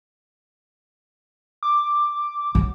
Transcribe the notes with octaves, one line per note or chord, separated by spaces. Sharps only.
D6
F#3